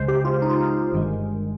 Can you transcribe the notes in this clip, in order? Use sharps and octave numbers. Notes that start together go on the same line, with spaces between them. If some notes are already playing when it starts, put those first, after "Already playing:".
Already playing: C#2 C#3 G#3 C5
G4
F4
D#4
F4
D#4
G1 G2 D#3 G#3